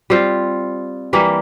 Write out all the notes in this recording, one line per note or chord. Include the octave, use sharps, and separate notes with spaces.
G3 C4 F4
E3 G3 A#3